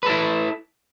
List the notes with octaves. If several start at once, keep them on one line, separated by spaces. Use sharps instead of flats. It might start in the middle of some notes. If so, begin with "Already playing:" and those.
E4 A4 B4